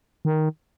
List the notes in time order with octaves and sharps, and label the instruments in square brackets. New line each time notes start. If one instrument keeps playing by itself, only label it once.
[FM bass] D#3